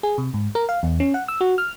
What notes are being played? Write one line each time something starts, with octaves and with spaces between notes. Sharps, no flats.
G#4
C3
G#2
A#4
F5
E2
C#4
F#5
E6
F#4
F6